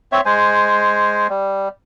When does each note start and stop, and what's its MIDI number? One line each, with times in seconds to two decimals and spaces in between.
0.12 0.21 60
0.12 0.21 73
0.12 0.21 76
0.26 1.27 56
0.26 1.27 72
0.26 1.27 80
1.29 1.68 55